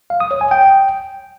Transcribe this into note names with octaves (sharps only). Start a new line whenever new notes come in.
F5
D#6
C#5
G#5
G5